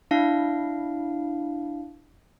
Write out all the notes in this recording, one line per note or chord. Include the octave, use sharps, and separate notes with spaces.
D4 E4 F5